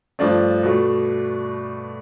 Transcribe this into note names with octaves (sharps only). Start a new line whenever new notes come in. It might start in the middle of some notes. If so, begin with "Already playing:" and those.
G2 F3 A3 D4 D5
B2 A3